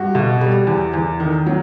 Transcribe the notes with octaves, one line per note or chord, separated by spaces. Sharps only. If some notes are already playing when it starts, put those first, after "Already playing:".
Already playing: G2 F#4
B2
G3
E2
E2
D#3
F#3